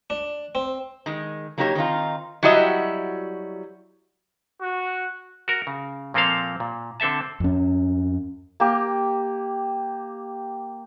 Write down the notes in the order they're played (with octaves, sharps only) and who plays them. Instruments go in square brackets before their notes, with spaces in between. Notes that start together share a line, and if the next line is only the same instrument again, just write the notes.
[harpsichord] D4
C4
[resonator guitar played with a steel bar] D#3 G#3
F#3 A#3 D#4 G4 C#5
D#3 C4 D#4 F4
F#3 G3 E4 F#4 D#5 E5
[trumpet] F#4
[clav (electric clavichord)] F#4 A#4
C#3
A#2 F3 A#3 C4 A4 F5
A#2
D3 C4 A4 E5 A5
[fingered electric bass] F2 C#4
[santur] A#3 G4